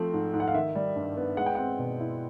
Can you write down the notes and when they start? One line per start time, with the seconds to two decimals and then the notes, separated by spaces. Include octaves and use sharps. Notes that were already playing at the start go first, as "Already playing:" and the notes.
Already playing: F3 A3 C4
0.13 G#2
0.33 G#2
0.40 F#5
0.48 F5
0.54 D#3 E5
0.75 G3
0.96 G2
1.17 B3
1.37 G#3 F#5
1.46 G5
1.55 C4 F#5
1.79 B2
2.00 E4